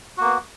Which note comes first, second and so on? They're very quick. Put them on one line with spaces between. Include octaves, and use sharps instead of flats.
F#4 A#3 B3